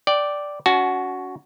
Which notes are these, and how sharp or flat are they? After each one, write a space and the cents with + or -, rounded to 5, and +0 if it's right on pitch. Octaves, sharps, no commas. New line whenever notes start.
D5 +0 G5 -15
C#4 +40 F#4 +0 A5 -40